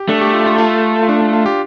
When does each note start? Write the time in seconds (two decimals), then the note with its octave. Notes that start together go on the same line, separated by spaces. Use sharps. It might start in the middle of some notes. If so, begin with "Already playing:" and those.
Already playing: G4
0.09 A3 D4
0.21 G4
0.34 F4
0.46 F4
0.58 F4
1.03 F4
1.09 D4
1.21 D4
1.33 F4
1.46 G4